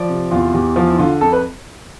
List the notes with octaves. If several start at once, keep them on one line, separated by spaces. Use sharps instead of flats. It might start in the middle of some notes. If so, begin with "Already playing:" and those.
Already playing: F3 D5
C3
E2 F4
E2 G4
F3 F4
E4
D3 F4
F2 A4
B4